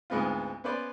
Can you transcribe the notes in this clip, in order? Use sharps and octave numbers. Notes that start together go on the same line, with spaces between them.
D2 G#2 G#3 B3 C4 F4
B3 C#4 B4 C5 D5